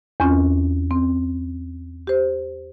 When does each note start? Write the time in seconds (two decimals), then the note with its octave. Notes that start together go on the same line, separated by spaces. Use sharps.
0.20 E2 C4 C#4 F4
0.91 C4
2.07 G4 C5